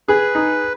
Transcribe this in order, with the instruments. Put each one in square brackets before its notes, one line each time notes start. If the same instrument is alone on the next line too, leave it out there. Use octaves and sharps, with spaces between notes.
[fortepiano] G#4 [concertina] B4
[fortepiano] D#4